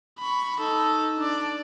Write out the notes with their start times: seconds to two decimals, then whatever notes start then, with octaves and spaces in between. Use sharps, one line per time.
0.19 B5 C#6
0.60 D#4 A4
1.18 D4 D5